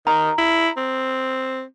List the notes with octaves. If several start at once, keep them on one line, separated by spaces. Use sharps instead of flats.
D#3 A#5
E4
C4